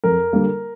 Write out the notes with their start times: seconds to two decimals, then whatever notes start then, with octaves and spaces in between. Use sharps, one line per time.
0.04 F2 A#4
0.33 D3 G3 A#3